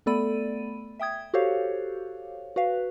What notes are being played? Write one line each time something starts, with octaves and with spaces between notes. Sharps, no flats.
A3 B3 A4 D5 B5 D#7
E5 G5 D#6 G#6
F#4 G4 A4 C5 C#5 F5
F#4 B4 F5